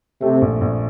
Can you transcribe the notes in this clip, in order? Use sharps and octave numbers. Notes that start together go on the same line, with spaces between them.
C3 A3
A#1
A#1